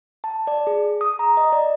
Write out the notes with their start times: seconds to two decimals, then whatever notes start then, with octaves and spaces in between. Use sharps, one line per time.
0.24 A5
0.47 D5
0.67 G#4
1.01 D#6
1.19 A#5
1.37 D#5
1.52 D5